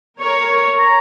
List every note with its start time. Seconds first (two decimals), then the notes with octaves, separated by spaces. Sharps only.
0.20 A#4 C#5 C#6
0.79 A#5